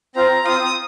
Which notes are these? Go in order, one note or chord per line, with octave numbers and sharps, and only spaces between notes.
C4 F4 C5 F5 A#5
C4 F4 C5 F5 D#6